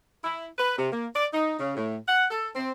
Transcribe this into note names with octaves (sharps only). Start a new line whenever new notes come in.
E4
B4
C3
A#3
D5
D#4
C#3
A2
F#5
A4
C4